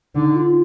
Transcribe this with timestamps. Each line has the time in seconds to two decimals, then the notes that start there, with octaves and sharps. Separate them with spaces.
0.15 D3 D#4
0.36 F4